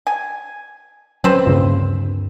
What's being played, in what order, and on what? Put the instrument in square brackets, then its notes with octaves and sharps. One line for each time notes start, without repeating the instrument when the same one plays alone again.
[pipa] G#5
[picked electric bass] F#3 C#4 [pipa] C4 B4 C5
[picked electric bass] D2 G2 A#3 [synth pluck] A#2 C#3